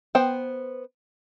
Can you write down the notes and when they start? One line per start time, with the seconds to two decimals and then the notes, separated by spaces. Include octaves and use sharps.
0.15 B3 C5 G5